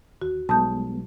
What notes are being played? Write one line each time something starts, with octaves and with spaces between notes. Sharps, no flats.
D#2 F#4
B1 G3 G#3 B3 A5 D#6 G6